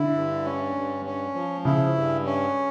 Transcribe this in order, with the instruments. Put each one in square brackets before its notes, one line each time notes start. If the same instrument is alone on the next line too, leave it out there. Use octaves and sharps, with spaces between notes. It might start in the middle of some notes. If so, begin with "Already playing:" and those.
Already playing: [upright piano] D3 [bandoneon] E4
[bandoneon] G2
C#4
G2
C#4
F3
[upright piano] C#3 [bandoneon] E4
[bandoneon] G2
C#4